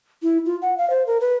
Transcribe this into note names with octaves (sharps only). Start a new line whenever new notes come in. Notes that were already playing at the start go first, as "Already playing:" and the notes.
E4
F4
F#5
F5
C5
A#4
B4